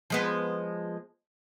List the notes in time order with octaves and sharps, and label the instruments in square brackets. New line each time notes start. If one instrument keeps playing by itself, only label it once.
[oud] F3 G#3 B3